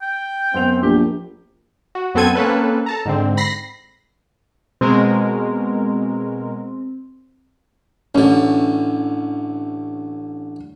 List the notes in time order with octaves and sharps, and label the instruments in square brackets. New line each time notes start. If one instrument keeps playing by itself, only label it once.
[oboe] G5
[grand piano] F#2 B3 F7 [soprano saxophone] C4
[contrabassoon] A#1 [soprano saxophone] G4
[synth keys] F#4
F#2 B3 C4 A4 G#6 D#7
A#3 C4 C#4 A4 B4
A4 A5 A#5
G#2 D3 C4
B5 A#6 C7
[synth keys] B2 G#3 A#4 [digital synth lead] C4
[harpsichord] A1 D3 [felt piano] C#4